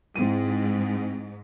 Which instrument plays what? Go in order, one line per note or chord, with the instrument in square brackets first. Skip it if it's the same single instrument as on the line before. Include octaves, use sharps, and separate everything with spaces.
[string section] G#2 [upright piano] C4 E4 D#7